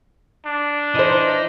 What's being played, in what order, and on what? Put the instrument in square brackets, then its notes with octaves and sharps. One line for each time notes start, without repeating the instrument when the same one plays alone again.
[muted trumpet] D4
[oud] E3 C5 [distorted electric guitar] D#4 D#5